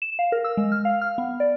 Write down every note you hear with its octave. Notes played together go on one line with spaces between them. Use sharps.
E7
F5
A#4
E6
G#3
F6
F5
F6
B3
D5